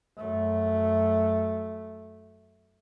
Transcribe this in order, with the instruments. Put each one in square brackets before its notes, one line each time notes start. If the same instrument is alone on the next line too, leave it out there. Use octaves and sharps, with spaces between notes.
[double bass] F#2 A3